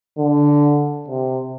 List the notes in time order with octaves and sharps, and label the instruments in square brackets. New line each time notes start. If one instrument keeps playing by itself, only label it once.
[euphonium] D3
C3